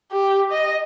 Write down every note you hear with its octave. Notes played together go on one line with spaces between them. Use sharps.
G4
D#5